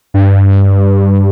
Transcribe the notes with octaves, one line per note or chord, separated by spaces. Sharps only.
G2